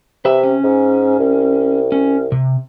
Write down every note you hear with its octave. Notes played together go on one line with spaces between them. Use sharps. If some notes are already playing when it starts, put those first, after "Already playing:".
C3 B4 E5
C#4
G#2
C2
C#4
C3